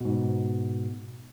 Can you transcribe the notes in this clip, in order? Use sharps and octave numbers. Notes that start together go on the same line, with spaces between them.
G#2 B2